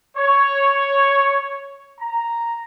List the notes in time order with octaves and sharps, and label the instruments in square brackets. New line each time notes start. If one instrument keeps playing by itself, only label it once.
[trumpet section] C#5
A#5